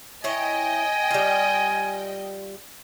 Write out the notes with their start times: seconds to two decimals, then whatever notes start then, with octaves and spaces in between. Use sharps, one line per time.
0.24 E4 C#5 D#5 G5 G#5
1.10 G3 F4